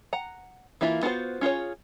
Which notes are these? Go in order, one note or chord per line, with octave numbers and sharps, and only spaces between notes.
F#5 A#5
E3 A#3 E4 F4
B3 F4 F#4 A4 C5
C#4 F4 G#4 C#5